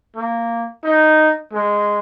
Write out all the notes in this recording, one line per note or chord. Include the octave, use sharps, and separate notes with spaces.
A#3
D#4
G#3